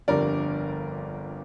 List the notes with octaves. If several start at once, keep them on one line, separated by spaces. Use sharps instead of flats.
G1 F2 D3 G3 A#4 D5